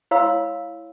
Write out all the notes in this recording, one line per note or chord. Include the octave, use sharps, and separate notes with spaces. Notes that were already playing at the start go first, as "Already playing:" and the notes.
E4 C#5 F5 B5 C6 E6